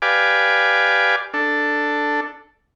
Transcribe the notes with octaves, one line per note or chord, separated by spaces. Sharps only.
G4 B4 D5 F5 G#5 D6
D4 A4